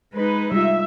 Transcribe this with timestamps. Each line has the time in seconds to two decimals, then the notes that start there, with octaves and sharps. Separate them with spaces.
0.14 G#3 D#4 B4
0.52 G3 F4 E5